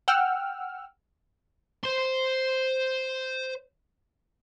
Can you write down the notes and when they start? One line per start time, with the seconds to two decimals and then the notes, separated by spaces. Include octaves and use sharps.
0.08 F#5 G5 E6 F6
1.84 C5 C6